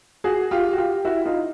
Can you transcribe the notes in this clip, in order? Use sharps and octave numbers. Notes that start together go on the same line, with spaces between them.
F#4 G#4
F4 G4
F#4
F4 G4
E4 F#4
D#4 F4